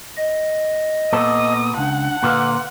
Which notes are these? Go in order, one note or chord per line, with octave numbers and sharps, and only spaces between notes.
D#5
A#2 B3 A4 D#6
C#2 D4 F#5
A#2 D3 F4 B4